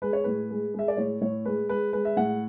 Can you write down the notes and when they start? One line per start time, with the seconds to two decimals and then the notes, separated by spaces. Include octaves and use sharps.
0.02 G#3 B4
0.13 C#5
0.24 A2 B4
0.50 G#3
0.74 G#3 E5
0.88 D5
0.97 A2 C#5
1.21 A2 C#5
1.45 G#3 B4
1.69 G#3 B4
1.93 G#3 B4
2.05 E5
2.17 A2 F#5